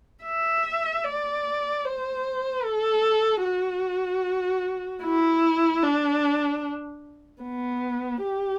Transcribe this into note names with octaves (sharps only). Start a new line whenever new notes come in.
E5
D5
C5
A4
F#4
E4
D4
B3
G4